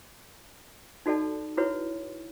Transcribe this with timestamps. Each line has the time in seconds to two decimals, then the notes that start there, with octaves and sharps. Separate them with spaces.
1.06 D#4 F#4 A4 D5 A5
1.57 E4 F#4 B4 C#5